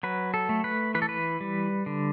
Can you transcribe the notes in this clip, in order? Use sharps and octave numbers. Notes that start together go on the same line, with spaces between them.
F#3 B4
A4
A3
B4
E3 B4
A4
B4
G3
D3